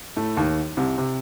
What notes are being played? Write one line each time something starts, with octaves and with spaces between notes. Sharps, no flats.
A2 A3
D#2 D#3
C2 C3
C3